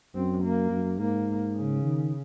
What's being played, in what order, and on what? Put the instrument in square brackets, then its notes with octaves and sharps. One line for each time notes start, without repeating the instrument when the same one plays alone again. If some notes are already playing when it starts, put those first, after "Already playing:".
[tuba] F#2 [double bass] C4
[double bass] A#3
[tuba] F#2
[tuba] G#2 [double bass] A#3
[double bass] C#3
[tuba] D#3